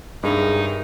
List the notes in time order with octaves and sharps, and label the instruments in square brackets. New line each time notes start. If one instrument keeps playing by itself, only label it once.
[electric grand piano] G2 [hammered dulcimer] C3 D#3 G#3 [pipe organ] D#4 [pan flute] G#4